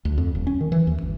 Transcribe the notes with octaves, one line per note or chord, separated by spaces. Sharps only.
D2
F2
D#1
C#4
D#3
E3
D#2
G1